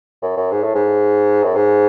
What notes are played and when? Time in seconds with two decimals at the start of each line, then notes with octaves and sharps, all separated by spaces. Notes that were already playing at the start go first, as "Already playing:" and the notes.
0.22 F#2
0.37 F#2
0.52 G#2
0.63 A2
0.75 G#2
1.44 F#2
1.56 G#2